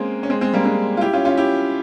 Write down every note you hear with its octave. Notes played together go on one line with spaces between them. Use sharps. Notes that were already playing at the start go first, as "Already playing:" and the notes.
Already playing: G#3 A#3 C4 C#4
C#4
G#3 C4
G#3 C4
G3 A#3
G#3 C4
F4
E4 G4
C#4 F4
C#4 F4
E4 G4